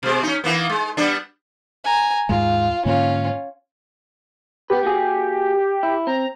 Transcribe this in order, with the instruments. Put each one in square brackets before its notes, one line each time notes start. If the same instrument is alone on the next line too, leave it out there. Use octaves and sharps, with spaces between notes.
[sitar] B2 G#3
C#4 D#4
E3 A#3 B3
G#3
G3 B3 D4
[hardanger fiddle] G#5 A#5
[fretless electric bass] D#2 G#2 G#3 [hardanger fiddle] F4
[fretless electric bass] G#2 D3 A#3 [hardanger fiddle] C#4 F4
[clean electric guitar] B3 B4 [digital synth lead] G4
[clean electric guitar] A#3 F#4 G#4
E4
[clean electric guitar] C4 [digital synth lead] A#5